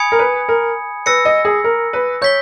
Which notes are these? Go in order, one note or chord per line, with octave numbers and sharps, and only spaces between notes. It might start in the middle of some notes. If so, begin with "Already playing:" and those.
Already playing: G#5 B5 D#6 G#6 C#7
A#4
B4
A#4
B4 E6 A#6 C#7
D#5
G#4
A#4
B4
C#5 G6 B6 G7